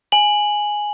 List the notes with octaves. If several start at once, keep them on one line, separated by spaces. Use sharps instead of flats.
G#5 F#7